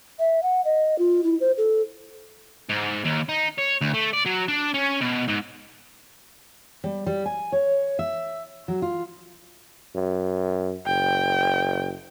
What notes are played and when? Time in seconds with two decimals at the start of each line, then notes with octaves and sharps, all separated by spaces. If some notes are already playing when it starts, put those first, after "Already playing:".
0.19 E5
0.43 F#5
0.65 D#5
0.99 F4
1.24 E4
1.41 C5
1.58 A4
2.69 G#2
3.05 D#2
3.29 D#4
3.58 C#5
3.81 D2
3.94 A3
4.14 D5
4.26 F#3
4.48 D4
4.74 C#4
5.01 B2
5.28 G#2
6.84 G3
7.06 G3
7.26 G#5
7.52 C#5
7.99 E5
8.68 F#3
8.82 F4
9.95 F#2
10.86 F#1 G5